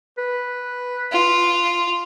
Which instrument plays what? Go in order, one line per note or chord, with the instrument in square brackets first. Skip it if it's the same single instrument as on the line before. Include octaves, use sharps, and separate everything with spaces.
[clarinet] B4
[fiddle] F4